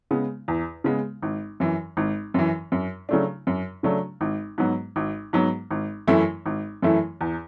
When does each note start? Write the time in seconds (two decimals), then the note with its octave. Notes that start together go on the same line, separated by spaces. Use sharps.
0.11 C#3 G#3 B3
0.48 E2
0.84 C#3 G#3 B3
1.22 G#1
1.60 F#2 E3
1.97 G#1
2.34 F#2 E3
2.72 F#2
3.09 C#3 F#3 A3 D4
3.47 F#2
3.83 C#3 F#3 A3 D4
4.21 G#1
4.58 G#2 F#3 B3
4.96 G#1
5.33 G#2 F#3 B3
5.71 G#1
6.07 F#2 E3 A3 E4
6.46 G#1
6.82 F#2 E3 A3 E4
7.21 E2